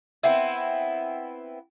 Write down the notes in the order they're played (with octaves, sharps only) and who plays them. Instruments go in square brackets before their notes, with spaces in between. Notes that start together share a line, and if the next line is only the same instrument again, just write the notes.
[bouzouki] B3 C4 E4